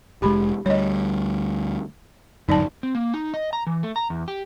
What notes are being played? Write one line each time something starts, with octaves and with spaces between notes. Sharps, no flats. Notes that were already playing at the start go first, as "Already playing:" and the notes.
F1 G#3 G4 B5
D2 G3 C#5 D#5
D1 G1 F#2 D#4 D5 A5
C4
A#3
D#4
D#5
A#5
E3
A3
A#5
E2
G4